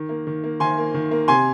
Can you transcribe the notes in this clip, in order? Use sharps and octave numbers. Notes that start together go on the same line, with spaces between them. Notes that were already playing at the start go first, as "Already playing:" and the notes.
Already playing: D#3
A#3
D#3
A#3
D#3 G#5 C6
A#3
D#3
A#3
C3 G#5 C6